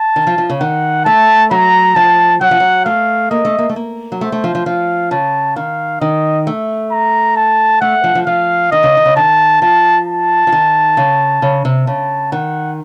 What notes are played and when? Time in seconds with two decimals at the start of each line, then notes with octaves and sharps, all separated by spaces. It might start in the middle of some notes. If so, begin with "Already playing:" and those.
Already playing: A5
0.16 D#3
0.27 F3
0.38 F3
0.50 C#3
0.61 D#3 F#5
1.05 A3 A5
1.51 F#3 A#5
1.95 F3 A5
2.41 F#3 F#5
2.51 F3
2.60 F#3
2.85 A3 F5
3.30 A#3 D#5
3.45 A3
3.59 A#3
3.69 A3
3.76 A#3
4.12 F#3
4.21 A3 C5
4.32 A3
4.44 F3
4.55 F3
4.66 F3 F5
5.11 C#3 A5
5.56 D#3 F5
6.01 D#3 D#5
6.47 A3
6.92 A#5
7.37 A5
7.81 A3 F#5
8.04 F3
8.15 F3
8.27 F3 F5
8.72 D#3 D#5
8.83 C#3
8.97 D#3
9.06 C#3
9.16 D#3 A5
9.61 F3 A5
10.08 A5
10.47 F3
10.52 D#3
10.97 C#3
11.42 C#3
11.65 C3
11.87 C#3 A5
12.32 D#3 F#5